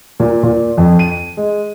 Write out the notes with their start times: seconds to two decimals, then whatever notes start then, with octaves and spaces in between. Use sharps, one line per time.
0.20 A#2
0.43 A#2
0.77 F2
0.99 D#7
1.37 G#3